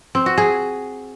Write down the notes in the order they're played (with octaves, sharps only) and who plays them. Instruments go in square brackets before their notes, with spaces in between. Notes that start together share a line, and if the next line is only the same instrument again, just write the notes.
[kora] C4
F#4
G#4